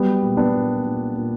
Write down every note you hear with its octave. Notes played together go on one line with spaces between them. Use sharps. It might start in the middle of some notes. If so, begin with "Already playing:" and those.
Already playing: F#3 G3 B3
A#2
B3 D4
A#2
A#2
A#2